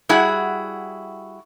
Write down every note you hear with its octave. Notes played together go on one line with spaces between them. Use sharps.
G3 E4 F#4 G#4 F#5